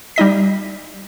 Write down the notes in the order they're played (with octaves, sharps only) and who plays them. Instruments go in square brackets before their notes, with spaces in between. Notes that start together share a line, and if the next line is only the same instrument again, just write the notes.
[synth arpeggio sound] G3 D#4 D#5 B6